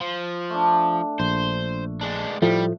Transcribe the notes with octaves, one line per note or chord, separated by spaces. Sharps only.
F3
A3 D4
A#1 C5
G#3 D4
A2 F3 G3 A3